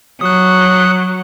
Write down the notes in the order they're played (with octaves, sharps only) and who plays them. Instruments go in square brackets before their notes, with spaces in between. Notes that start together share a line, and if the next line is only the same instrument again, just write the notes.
[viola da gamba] F#3 [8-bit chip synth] D#6 F#6